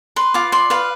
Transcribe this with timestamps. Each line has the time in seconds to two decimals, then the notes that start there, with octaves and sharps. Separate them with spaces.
0.16 B4 C6
0.34 F4 D6
0.52 D5 C6
0.70 B4 F5